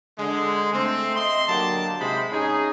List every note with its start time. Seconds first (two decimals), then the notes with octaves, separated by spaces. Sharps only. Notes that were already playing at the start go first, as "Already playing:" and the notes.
0.19 D3 G#3
0.74 A3 C4
1.16 D#5 C6
1.48 D3 F#3 A#3 G4 A5
2.00 G#2 C3 G#3 C5 B5
2.32 C#4 D#4 G#4